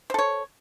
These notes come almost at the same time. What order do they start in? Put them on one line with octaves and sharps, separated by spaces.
C5 A4 C#5